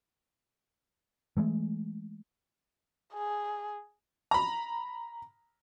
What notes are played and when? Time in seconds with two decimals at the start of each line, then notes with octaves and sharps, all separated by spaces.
1.37 E3 F#3 G#3 A3
3.13 G#4
4.31 A#5 B5